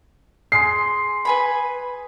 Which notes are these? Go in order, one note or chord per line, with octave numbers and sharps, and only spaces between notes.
G#4 C6 C7
B4 G#5 B5